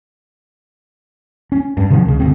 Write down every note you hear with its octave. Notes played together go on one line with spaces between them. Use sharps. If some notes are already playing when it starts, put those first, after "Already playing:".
C#4
G2
C3 D#3 F3 F#3
C#2 C#3
G1 D2 C4